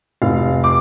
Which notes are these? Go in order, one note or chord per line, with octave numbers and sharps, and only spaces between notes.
F1 F5
D6